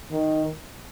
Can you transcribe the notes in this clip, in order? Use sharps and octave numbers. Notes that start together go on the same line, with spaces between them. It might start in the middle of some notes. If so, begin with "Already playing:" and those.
D#3